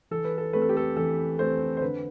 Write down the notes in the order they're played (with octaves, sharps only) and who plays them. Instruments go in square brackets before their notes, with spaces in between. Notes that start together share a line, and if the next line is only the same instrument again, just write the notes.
[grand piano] E3 A4
B4
A4
A3 C4 B4
A4
G4
A4
E3 A4
A3 C4 C5
C5
D3 B4